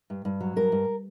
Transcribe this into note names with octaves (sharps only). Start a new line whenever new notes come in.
G2
G2
F#3
G2 A#4
G2